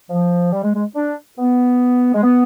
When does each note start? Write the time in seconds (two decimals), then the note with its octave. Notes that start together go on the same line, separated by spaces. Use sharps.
0.10 F3
0.53 G3
0.64 G#3
0.74 G#3
0.96 D4
1.38 B3
2.14 G#3
2.23 B3